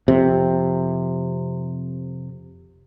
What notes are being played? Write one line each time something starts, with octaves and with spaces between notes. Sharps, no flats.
F2 C3